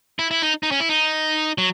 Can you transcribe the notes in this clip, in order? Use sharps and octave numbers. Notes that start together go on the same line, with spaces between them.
E4
E4
D#4
D#4
C#4
E4
D#4
F#3